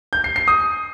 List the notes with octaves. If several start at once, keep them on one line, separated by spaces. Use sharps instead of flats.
G6
C7
C7
D#6